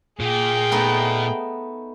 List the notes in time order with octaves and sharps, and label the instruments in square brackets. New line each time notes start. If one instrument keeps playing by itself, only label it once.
[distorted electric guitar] A#2 [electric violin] G#4 G5
[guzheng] A3 B3 D#4